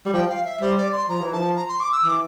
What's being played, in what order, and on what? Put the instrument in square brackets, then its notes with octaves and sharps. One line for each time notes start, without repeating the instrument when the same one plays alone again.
[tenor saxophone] G3
[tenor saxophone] F3 [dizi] G5
[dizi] F5
E5
[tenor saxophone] G3 [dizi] C5
[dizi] D5
C6
[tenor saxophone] F3 [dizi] A#5
[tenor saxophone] E3
[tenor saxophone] F3 [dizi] A5
[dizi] A#5
C6
D6
E6
[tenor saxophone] E3 [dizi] D6